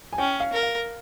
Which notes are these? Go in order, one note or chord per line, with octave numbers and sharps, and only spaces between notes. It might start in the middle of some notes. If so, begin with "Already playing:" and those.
G#5
C#4 G5
F5
A#4
F5